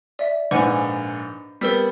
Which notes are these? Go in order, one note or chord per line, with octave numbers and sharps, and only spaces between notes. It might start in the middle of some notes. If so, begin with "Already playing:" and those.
D5 E5
A#1 G#2 B4 F#5 G#5
G3 B3 A#4 E6 B6